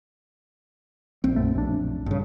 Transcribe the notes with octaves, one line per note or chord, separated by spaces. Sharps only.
A#1 C4
B1 F#2 A3
B1 D4
G1 G2 C#3